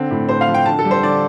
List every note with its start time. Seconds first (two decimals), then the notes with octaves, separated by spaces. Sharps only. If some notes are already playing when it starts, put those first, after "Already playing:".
Already playing: D3 C4
0.11 A2
0.29 A2 C5
0.41 F5
0.48 F3
0.54 G5
0.66 D3 A5
0.79 A4
0.85 G3
0.91 C5
1.03 D3 D5